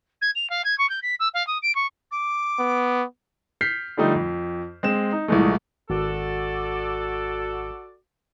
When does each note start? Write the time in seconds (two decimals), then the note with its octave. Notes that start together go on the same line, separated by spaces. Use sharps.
0.22 G#6
0.35 F7
0.50 F5
0.65 G#6
0.78 C#6
0.90 G6
1.03 B6
1.20 E6
1.34 F5
1.47 D#6
1.63 D7
1.75 C#6
2.11 D6
2.59 B3
3.61 F6 G6 B6 C7
3.97 D3 F3 G3 A3 D#4
4.15 F2
4.83 G#3 C4 E7
5.12 D#4
5.28 C2 A#2 E3 G#3 A3
5.90 G#1 F#4 A4 D5